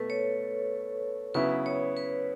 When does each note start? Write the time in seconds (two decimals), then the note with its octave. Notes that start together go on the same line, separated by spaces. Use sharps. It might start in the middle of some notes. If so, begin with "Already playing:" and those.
Already playing: B2 A3 A4 B4
0.10 C#5
1.34 C#3 F#3 B3 E4 B4
1.66 C#5
1.97 B4